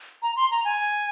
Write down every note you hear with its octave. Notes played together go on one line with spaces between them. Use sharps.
A#5
C6
A#5
G#5